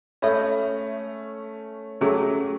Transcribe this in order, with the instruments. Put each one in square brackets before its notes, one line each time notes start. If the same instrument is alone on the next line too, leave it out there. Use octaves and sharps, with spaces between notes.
[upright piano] A3 C#4 [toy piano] A4 C#5 E5 B5
[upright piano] F#3 A3 [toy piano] C#4 G#4